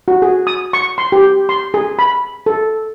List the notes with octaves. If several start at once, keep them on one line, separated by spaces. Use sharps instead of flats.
F#4
G#4
D#6
C#6
C6
G4
C6
G#4
B5
A4